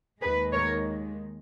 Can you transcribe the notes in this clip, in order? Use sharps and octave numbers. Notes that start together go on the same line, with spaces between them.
D#2 D#3 G#3 G#4 B4
A#4 C#5